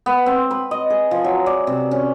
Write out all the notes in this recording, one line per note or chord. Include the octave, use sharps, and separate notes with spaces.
B3
C4
B4
D#5
G#4
F3
F#3
D5
C3
C#4